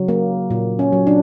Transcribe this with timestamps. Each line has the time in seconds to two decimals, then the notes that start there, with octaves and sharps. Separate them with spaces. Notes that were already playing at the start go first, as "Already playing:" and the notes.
Already playing: C#3 F#3
0.08 A#3
0.51 A#2
0.79 C#4
0.92 F#3
1.07 D4